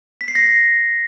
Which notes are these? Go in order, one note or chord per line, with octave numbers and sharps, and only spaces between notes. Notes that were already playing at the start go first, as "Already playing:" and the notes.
B6
C7
A#6